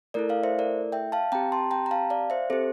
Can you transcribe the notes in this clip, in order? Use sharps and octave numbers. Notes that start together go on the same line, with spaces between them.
A3 E4 A4 A#4 D5
D5 F5
C5 E5
A#4 D5
E5 G5
F5 A5
C4 G4 G5 A#5
A5 C6
G5 A#5
A#5
F5 A5
D5 F5
C5 E5
C4 G4 A4 C5